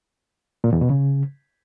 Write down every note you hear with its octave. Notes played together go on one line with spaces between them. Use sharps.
A#2
E2
B2
C#3